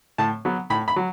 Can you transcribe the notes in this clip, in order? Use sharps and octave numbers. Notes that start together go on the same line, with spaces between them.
A2 A5
F#3 B3
A2 B5
B5
F#3